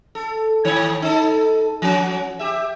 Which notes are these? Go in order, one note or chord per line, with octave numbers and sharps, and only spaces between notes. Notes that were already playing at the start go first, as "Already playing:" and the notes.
A4
A2 D#3 C#5
D#4 A4
F3 C#4 F#4
G4 E5